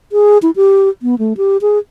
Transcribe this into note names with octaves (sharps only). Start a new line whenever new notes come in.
G#4
E4
G4
B3
A3
G4
G#4